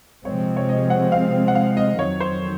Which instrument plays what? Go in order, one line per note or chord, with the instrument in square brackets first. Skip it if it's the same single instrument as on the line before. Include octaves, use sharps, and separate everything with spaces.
[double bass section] C3 F3 G#3 C4 [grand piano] C#5
[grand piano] C#5
D#5
F#5
F5
F#5
F5
D#5
[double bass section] F2 D#3 F#3 [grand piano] C#5
[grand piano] C5